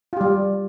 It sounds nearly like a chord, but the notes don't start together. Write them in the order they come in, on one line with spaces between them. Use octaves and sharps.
F4 G4 G3